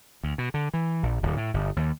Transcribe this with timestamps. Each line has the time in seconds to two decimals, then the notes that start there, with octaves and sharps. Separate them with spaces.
0.23 D2
0.38 B2
0.54 D3
0.74 E3
1.03 A#1
1.23 D1
1.37 A2
1.54 G1
1.76 D#2